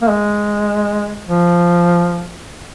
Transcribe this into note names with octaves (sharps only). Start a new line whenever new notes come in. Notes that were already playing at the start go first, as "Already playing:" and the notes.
A#3
G#3
F3